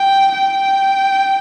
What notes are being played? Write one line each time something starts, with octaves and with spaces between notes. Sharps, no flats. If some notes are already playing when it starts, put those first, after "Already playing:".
Already playing: G5
G5